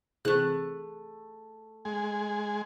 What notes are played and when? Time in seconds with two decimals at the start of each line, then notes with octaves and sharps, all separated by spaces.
0.25 C3 E3 A3 C4 G#4 F#6
1.85 G#3 G#5